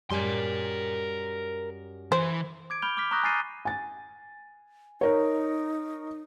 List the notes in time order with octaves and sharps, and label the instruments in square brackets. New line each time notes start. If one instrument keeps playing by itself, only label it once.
[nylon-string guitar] F#2 G3 G#5 [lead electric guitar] A#4 C6
[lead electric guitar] E3 [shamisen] C5
[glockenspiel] D6 G#6 D7
B5 F6 G6 D7 F7 G7
D6 F6 B6
A#5 C#6 D#6 F#6 G6 A#6
G#5 F6 A6 C7 D#7
[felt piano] G#5 A6
[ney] D#4 [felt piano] A#4 C#5